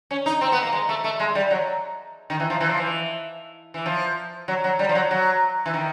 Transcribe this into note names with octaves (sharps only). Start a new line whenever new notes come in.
C#4
D#4
C4
B3
A#3
G#3
A3
A3
G#3
G3
F#3
D#3
E3
F3
E3
F3
E3
E3
F3
F#3
F#3
G3
F3
F#3
F#3
E3
D#3